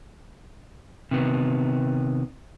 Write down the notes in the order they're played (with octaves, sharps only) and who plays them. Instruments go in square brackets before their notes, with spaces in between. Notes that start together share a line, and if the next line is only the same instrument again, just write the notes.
[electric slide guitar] C3 D#3 B3